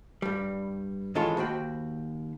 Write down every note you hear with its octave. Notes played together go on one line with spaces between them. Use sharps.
G2 G3
D#3 E3 G#3 F4 A4 C#5
D#2 F#4 C5 G5 B5